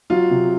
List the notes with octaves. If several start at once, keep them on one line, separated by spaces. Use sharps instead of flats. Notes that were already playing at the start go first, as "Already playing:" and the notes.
F#3 F4
C3